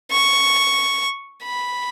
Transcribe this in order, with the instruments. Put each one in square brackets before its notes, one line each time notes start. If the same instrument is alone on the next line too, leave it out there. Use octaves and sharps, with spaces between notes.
[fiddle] C#6
B5